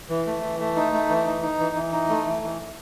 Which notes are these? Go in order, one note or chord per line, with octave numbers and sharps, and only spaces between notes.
E3
A3
E3
A3
D#4
A3
E3
D#4
D#4
E3
E3
D#4
A3
E3
E3